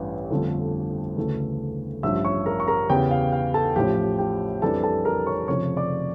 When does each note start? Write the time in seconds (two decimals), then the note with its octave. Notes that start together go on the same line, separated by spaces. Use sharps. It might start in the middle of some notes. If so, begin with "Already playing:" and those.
Already playing: A1 G2 E3
0.31 G1 F2 D3 F3 A3
1.17 D2 C#3 E3 A3
2.03 A1 G2 F3 E5 E6
2.25 C#5 C#6
2.46 A#4 A#5
2.60 C#6
2.68 A#4 A#5
2.89 E2 C#3 E3 G4 G5
3.11 F5
3.32 F5
3.54 A4 A5
3.76 A1 A2 F3 G4 G5
4.19 G4 G5
4.62 F2 E3 G3 D4 A4 A5
4.84 A4 A5
5.05 A#4 A#5
5.27 C#5 C#6
5.48 F1 F2 C#3 F3 C#5 C#6
5.77 D5 D6